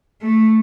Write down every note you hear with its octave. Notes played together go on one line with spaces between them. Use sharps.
A3